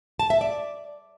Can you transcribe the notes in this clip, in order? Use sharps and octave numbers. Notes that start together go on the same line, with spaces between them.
A5
E5
D5